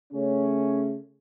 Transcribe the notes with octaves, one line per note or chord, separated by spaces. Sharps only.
C#3 A3 C#4